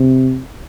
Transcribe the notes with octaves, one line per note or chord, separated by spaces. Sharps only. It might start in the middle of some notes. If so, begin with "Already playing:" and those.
Already playing: C3